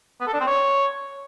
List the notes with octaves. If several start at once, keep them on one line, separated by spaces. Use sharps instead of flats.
B3
A4
D4
C4
C#5